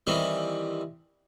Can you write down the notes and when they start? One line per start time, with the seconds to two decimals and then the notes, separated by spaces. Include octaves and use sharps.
0.07 D#3 E3 G3 C4